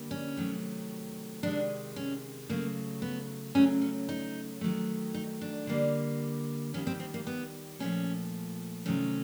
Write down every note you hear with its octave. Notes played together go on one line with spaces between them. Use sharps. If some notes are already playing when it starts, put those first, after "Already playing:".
Already playing: D3 G3 A#3
C#4
C3 D#3 F#3 A3
C3 D#3 G#3 D4
C#4
C#3 F#3 A3 A#3
B3
C#3 F#3 A3 C#4
C#4
D#4
D#3 F#3 A3
D#4
D4
D3 G3 A#3
D#3 G3 A#3 C#4
C4
C4
A#3
B3
A#2 F3 A3 C#4
C3 D#3 F#3 A3 C#4